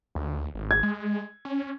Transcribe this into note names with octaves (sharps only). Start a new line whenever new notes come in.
D2
G#1
G#6
G#3
C#4